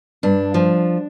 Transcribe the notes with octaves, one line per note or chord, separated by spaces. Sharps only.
G2 D4
F3